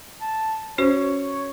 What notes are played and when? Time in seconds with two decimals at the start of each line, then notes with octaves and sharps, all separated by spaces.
0.21 A5
0.78 C#4 F#4 C5 C#5